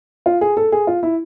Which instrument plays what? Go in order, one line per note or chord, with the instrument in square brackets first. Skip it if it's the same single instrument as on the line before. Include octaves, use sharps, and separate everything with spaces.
[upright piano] F4
G#4
A4
G#4
F4
E4